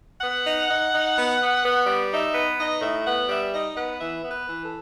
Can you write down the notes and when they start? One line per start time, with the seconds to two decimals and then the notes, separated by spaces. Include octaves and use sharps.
0.21 B3 F#5
0.45 D#4
0.69 D#4
0.93 D#4
1.17 B3
1.40 B3
1.63 B3
1.87 G3
2.11 D#4 E5
2.35 B3
2.58 D#4 D#5
2.82 A2 E5
3.05 B3 F#5
3.28 G3 E5
3.52 D#4 D#5
3.76 B3 F#5
3.99 E3 E5
4.23 B3
4.31 B4
4.48 E3
4.63 A4